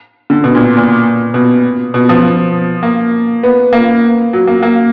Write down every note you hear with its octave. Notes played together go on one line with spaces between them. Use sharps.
D3
B2
A#2
A#2
B2
B2
F3
A#3
B3
A#3
F#3
A#3
A#3